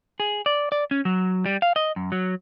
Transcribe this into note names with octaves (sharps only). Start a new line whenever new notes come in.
G#4
D5
D5
C#4
F#3
G3
F5
D#5
F#2
F#3